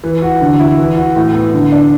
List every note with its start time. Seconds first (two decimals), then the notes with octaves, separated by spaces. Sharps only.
0.04 E3
0.22 F#4
0.41 D3
0.60 E4
0.78 E3
0.97 F#4
1.16 A2
1.34 B3
1.54 D3
1.72 D4